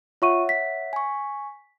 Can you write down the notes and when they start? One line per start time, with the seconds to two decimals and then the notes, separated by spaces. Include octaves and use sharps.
0.22 F4 C#5 E5 F#5 C#6 D#7
0.49 B6
0.93 G#5 C#6